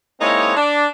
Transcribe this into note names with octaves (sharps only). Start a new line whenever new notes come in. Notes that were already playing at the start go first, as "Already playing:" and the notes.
G#3 A#3 C4 D#4 E4 C#5
D4